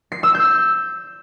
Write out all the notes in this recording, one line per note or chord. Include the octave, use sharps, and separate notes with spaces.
C7
E6
G6